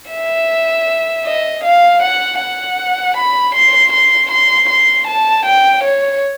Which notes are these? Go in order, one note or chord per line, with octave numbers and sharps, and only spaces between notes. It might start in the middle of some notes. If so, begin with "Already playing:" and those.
E5
D#5
F5
F#5
F#5
B5
C6
C6
C6
C6
A5
G5
C#5